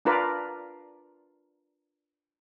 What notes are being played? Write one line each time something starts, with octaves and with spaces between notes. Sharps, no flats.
D4 F4 A#4 B4 D5